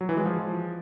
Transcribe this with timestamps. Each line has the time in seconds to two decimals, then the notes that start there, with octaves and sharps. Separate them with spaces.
0.01 F#3
0.09 E3
0.17 G#3
0.25 F3